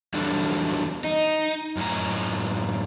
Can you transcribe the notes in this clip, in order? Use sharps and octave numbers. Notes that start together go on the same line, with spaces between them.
E2 F#3 G3 D4 A4
D#4
F#2 A2 A#5